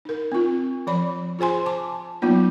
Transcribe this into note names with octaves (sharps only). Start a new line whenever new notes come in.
D#4 A#4
C4 F4
F3 D5 B5
F4 G#4 C5 G#5 C6
A5 D6
F#3 A#3 B3 D#4 F4